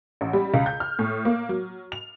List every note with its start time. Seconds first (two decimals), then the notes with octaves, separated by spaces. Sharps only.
0.21 A1
0.33 G3
0.54 C#2
0.66 G6
0.80 F6
0.99 A2
1.25 A#3
1.49 F#3
1.92 F7